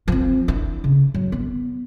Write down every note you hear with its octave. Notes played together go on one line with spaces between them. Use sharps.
F3 C4
D4 E4
C#3
F#3
B3